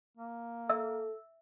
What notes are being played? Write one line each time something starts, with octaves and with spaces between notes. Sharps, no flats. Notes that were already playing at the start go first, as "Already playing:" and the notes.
A#3
A4 E5 E6